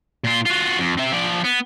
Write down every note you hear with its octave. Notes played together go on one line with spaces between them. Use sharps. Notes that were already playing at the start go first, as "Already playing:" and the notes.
A#2 F4
F4 F#4
F2
C4 E5
F3 D5
B3